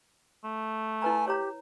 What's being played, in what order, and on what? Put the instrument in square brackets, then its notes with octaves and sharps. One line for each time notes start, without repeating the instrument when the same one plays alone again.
[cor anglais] A3
[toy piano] E4 B4 A#5 [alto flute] G#5
[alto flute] G4 [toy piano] C#5 A#5